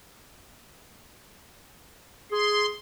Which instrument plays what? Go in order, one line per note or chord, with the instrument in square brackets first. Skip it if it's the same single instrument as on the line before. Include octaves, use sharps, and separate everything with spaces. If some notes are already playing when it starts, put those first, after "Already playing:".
[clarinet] G#4 [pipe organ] C6